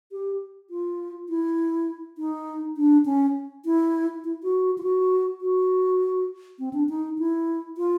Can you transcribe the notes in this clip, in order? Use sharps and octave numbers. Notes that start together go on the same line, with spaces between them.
G4
F4
E4
D#4
D4
C#4
E4
E4
F#4
F4
F#4
F#4
C4
D4
D#4
E4
F4